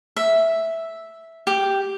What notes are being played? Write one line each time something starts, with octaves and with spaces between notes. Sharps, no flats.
E5
G4